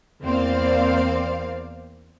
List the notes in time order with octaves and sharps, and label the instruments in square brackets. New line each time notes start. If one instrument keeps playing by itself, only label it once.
[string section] E2 A#3 C4 C5 D5 F5